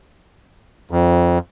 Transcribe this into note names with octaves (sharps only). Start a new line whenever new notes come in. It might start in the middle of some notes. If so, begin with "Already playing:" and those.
F2